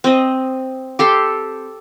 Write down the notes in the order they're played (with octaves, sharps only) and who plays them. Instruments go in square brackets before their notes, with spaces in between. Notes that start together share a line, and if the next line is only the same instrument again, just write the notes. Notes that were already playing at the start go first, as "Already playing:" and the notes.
[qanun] C4 D#5
G4 A4 C6